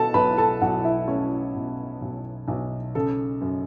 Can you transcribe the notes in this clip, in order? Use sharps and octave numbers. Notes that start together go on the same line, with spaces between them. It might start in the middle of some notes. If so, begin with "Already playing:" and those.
Already playing: B2 F#4 A4 A5
B1 B4 B5
A4 A5
B1 F#4 F#5
E4 E5
A3 C#4 C#5
B2
B1
B1
C#3 A4
F#2